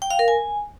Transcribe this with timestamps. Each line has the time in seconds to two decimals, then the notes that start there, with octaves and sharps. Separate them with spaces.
0.02 G5
0.10 F5
0.19 A#4
0.28 G#5